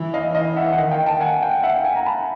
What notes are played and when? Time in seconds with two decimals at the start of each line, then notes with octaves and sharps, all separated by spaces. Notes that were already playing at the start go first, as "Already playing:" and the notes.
Already playing: E3
0.14 D#5 F5
0.35 E3 D#5 F5
0.56 E5 F#5
0.72 F#5
0.78 D#3 D#5 F5
0.91 F5 G5
1.06 G5 A5
1.21 F#5 G#5
1.42 F5 G5
1.63 E5 F#5
1.74 F5 G5
1.84 F#5 G#5
1.96 G#5 A#5
2.06 A5 B5